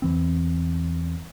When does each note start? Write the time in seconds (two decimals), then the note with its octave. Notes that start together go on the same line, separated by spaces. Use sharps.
0.02 E2 E3 C4